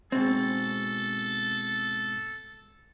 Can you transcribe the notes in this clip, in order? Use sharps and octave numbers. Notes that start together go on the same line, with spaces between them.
G#2 B2 C4 A4